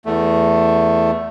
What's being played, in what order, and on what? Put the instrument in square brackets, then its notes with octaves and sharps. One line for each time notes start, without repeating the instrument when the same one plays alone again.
[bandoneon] E2 A3